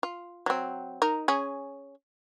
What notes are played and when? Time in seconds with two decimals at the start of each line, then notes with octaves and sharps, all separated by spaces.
0.03 F4
0.46 F#3 C4
1.02 D#4 A#4
1.28 C#4 G#4